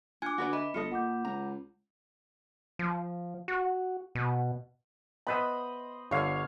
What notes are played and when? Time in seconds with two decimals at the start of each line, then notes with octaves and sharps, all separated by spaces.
0.22 D4 F4 G#5 D6 F#6 G#6
0.38 D3 F#4 B4 D5
0.53 B4 D#5 E5 B5
0.74 G1 F4 A4 D#5 C#7
0.92 A#2 F#5 D6 G6
1.25 C#2 A#5
2.79 F3
3.48 F#4
4.15 B2
5.27 B3 B4 C5 D#5 E5 B5
6.11 G1 D3 C#5 F5